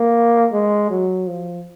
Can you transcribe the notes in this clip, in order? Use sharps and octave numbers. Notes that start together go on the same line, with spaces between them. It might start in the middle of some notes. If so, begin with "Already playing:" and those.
Already playing: A#3
G#3
F#3
F3